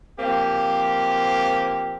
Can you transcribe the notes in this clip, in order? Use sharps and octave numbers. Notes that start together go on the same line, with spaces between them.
F3 A#3 C4 G4